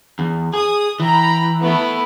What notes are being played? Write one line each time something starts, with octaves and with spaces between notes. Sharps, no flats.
E2
G#4 D#6
E3 G5 A#5 B5
A3 B3 E4